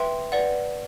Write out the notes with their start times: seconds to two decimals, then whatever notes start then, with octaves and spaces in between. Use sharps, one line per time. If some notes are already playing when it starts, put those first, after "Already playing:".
Already playing: B4 E5 G5 C6
0.32 B4 D5 F#5